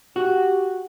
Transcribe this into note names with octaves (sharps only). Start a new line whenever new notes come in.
F#4 G4